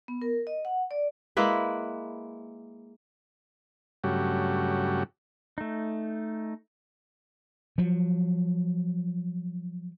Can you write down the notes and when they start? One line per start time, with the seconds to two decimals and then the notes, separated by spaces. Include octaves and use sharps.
0.08 B3
0.22 A#4
0.47 D#5
0.65 F#5
0.91 D5
1.37 G#3 A#3 E4 B4
4.04 G2 C#3 F#3 A3 F#4 G4
5.58 A3 D#4
7.78 F3 F#3